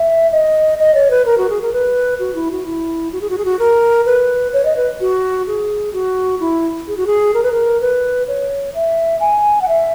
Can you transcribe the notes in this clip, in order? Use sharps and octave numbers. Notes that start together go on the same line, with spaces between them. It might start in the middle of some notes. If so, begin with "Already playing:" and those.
Already playing: E5
D#5
D#5
C#5
B4
A#4
F#4
G#4
A#4
B4
F#4
E4
F#4
E4
F#4
G#4
F#4
G#4
F#4
A#4
B4
C#5
D#5
B4
F#4
G#4
F#4
E4
G#4
F#4
G#4
A#4
B4
A#4
B4
C#5
E5
G#5
F#5
E5